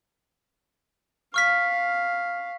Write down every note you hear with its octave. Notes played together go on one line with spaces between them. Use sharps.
F5 C#6 F6 B6